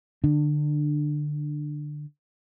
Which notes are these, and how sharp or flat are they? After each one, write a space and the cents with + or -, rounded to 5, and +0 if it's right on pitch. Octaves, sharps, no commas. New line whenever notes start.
D3 +15 D4 +25